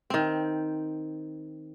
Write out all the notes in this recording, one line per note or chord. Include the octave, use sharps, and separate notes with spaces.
D#3 C4